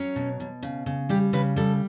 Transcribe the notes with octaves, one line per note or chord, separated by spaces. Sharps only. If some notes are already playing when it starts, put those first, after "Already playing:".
Already playing: F#3 C#4
B2
B2
C#3
C#3
G3 G4
C#3 B4
G3 A4